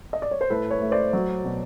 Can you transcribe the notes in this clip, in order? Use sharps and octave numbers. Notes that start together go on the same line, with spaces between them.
D#5
D5
C#5
C5
A2 A4 B4
B4 C#5
A3
C5 D5
F#3
B2